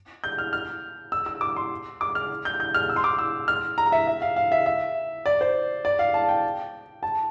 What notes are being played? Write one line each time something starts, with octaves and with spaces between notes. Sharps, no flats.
G6
F6
F6
E6
E6
D6
C6
D6
F6
G6
G6
F6
E6
C6
D6
E6
F6
A#5
E5
E5
F5
F5
E5
E5
D5
C5
D5
F5
A5
G5
A5